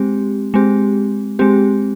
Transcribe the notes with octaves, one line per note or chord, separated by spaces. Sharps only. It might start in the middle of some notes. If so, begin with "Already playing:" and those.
Already playing: G#3 C4 G4
G#3 C4 G4
G#3 C4 G4